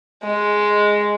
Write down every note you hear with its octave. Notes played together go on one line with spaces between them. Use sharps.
G#3